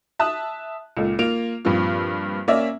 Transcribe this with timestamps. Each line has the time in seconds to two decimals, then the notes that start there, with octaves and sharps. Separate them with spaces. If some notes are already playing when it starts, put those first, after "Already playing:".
0.19 E5 A5 D#6 F#6
0.97 C#2 A#2 A4
1.19 A#3 F4 D7 F7
1.65 G2 A#2 F3 C4 F4
2.48 A#3 C#4 D5 E5